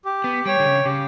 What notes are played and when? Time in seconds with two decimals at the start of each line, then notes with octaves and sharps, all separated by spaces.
0.05 G4
0.24 B3
0.45 G3 C#5 G5
0.60 D3
0.65 C#3
0.85 C#3 G4